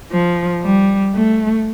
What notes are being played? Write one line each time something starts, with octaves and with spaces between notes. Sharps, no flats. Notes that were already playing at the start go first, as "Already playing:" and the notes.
F3
G3
A3